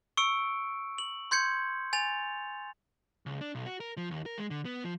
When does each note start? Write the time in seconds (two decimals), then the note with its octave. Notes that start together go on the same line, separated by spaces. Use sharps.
0.17 C#6 E6 C#7 D7
0.98 F#7
1.31 C6 G6 G#6 C#7
1.93 G#5 A6 F7
3.26 C#2
3.41 D4
3.55 B1
3.66 F#4
3.80 A#4
3.97 F3
4.11 D#2
4.26 A#4
4.38 G#3
4.50 D3
4.65 B3
4.84 F3